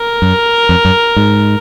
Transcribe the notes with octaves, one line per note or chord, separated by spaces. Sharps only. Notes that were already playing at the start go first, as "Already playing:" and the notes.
Already playing: A#4
F#2
F2
F#2
G#2